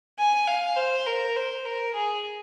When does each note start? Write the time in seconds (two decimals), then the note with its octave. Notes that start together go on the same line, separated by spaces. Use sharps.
0.19 G#5
0.48 F5
0.77 C5
1.07 A#4
1.36 C5
1.65 A#4
1.94 G#4